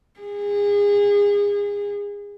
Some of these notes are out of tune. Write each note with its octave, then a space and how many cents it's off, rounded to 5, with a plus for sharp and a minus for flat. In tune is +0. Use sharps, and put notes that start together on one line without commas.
G#4 -30